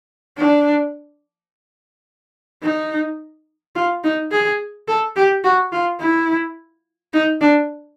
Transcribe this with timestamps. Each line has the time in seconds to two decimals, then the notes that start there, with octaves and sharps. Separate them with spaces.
0.38 D4
2.63 D#4
3.76 F4
4.04 D#4
4.31 G#4
4.88 A4
5.16 G4
5.44 F#4
5.72 F4
6.01 E4
7.13 D#4
7.41 D4